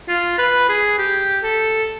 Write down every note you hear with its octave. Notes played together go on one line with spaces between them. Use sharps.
F4
B4
G#4
G4
A4